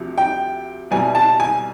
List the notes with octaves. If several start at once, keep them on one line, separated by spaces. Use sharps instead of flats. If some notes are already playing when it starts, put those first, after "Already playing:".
Already playing: D2 C3 F3
G5
C2 B2 G3 G#5
A5
G#5